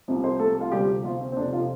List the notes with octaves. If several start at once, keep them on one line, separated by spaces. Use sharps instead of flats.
C2 C3 F3
C4 C5
A3 A4
F4
D2 C3 F3 G3 G4
F3 F4
C4
C4
F1 F2 C3 D4
F3 F4